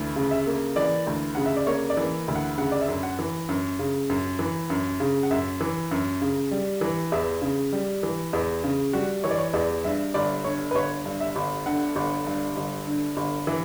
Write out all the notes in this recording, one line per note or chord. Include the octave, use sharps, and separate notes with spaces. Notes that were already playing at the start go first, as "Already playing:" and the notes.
Already playing: D2 E3
C#3
E5
A#3
E3 D5
D2
C#3 F#5
E5
D5
A#3 C#5
D5
E3
D2
F#5
C#3 F#5
D5
E5
F#2
F#5
E3
F#2
C#3
F#2
E3
F#2
C#3
F#5
F#2 E5
E3
F#2
C#3
G3
E3
E2 E5
C#3
G3
E3
E2
C#3
G3 F#4
E3 C#5
D5
C#5
E2 D5
G2 E5
G1 D5
D3 C#5
B4
G1 C#5
G2
E5
G1
D3 F#5
G1
G2
G1
D3
G1
E3 E5